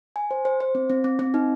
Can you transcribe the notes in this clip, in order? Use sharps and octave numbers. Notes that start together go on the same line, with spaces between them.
G#5
C5
C5
C5
C4
C4
C4
C4
D#4